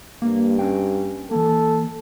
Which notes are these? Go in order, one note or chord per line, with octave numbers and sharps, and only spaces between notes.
G2 A#3
C#4 B4 G5
E3 A#3 A4